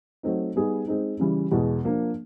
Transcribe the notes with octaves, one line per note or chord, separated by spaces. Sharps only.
F#3 A3 C4 D#4
G3 B3 D#4 G#4
G#3 C4 D#4
C#3 E3 G3
E2 B2 G#3
F3 A#3 D4